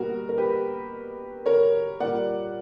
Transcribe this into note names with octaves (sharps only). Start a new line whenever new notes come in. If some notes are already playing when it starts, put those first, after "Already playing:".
Already playing: B2 G3 A#3 F#4 A#4
A#4
G4 B4
A#4 C#5
A#2 G3 A#3 D5 F#5